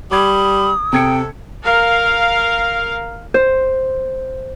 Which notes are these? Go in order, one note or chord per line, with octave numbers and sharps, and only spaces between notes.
G3 B5 D6 D#6 G#6
C3 A4 G5 G#6 C#7
A#4 F5
C5